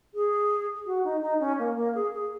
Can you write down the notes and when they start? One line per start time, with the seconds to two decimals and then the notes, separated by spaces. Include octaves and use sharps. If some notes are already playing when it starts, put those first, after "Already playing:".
0.14 G#4
0.86 F#4
1.04 D#4
1.22 D#4
1.40 C#4
1.59 A#3
1.76 A#3
1.95 G#4
2.13 G#4